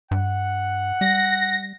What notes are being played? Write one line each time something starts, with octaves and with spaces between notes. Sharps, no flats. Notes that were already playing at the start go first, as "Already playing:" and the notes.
G2 F#5
G3 A#6